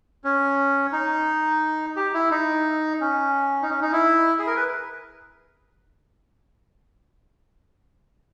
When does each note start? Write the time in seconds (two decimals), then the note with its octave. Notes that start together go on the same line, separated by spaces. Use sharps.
0.24 C#4
0.92 D#4
1.96 G4
2.14 E4
2.31 D#4
3.01 C#4
3.62 D#4
3.70 C#4
3.82 D#4
3.92 E4
4.39 G#4
4.47 A#4
4.56 B4